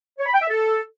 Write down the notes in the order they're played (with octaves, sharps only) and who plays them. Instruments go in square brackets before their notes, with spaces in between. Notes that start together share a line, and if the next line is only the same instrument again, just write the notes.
[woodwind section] C#5
B5
G5
E5
A4